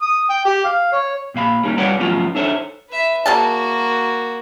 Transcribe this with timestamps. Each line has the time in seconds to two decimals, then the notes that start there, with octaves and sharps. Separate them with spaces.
0.02 D#6
0.30 G5
0.45 G4
0.65 F5
0.93 C#5
1.34 A#2 A#3 F5 B5
1.63 G3 A#3 C#4 D#4
1.78 G3 B4 C#5 D5 F5 F#5
1.99 F3 F#3 A3 B3 C#4 F4
2.35 D4 D#4 A4 C5 C#5 E5
2.89 B4 E5
3.26 F#3 A#3 F#4 G#4 A5